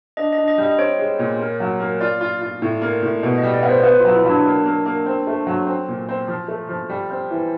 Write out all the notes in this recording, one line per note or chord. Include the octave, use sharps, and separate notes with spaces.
D4 D#5
D#5
D4
D#5
G3
D#5
C4 C#5
G#3
A#2
A#3
F#3
A#3
F4 D5
F4
F4
A2
A#3
A2
B2
D#5
G3
D5
B3
C5
B3 B4
F4
F#3
E4
F#3 D4
A#3
A#3
A#3
C4
A3
F#3
C4
A#2
C4
F3
A3
F3
G3
C4
E3